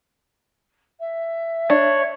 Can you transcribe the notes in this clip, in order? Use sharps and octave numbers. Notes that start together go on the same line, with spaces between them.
E5
D4 C#5